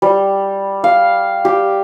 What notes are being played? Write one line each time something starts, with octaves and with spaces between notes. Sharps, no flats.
G3
F5
G4